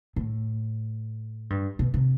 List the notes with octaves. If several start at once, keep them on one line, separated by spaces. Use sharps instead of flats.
A2
G2
B2
C3